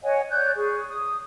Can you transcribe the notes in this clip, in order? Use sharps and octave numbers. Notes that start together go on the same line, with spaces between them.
C#5 D#5 F#5 G#5
C#5 D5 F#6 G6
G#4 C#6
D#6